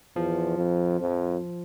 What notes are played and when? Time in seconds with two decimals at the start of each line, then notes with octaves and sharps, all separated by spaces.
0.16 E2 F3
0.58 F2
1.00 F2